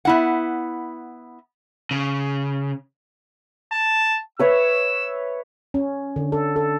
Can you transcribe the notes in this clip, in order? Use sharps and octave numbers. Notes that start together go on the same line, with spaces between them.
B3 E4 F#5
C#3
A5
B4 C#5 E5 E6
C#4
D3
A4
A4